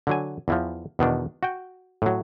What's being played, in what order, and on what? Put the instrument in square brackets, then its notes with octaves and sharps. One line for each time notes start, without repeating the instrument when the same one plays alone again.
[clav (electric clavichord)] D3 F#3 G#5
E2 E3 F3
E2 B2 D#3 D4
F#4 G5
A2 F#3